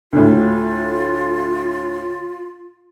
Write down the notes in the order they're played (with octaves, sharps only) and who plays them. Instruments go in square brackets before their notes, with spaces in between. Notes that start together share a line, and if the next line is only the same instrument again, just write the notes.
[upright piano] D2 A2 [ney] F4